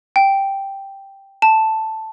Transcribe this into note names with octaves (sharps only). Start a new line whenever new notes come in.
G5
A5